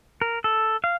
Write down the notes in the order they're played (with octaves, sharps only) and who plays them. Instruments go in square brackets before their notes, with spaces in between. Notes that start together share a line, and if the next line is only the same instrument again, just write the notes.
[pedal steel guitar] A#4
A4
F5